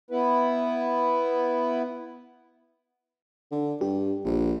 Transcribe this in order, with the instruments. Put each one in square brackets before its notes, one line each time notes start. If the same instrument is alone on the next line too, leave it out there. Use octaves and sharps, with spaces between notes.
[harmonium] B3 E4 B4
[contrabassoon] D3
[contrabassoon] G2 [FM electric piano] G4
[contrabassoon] A#1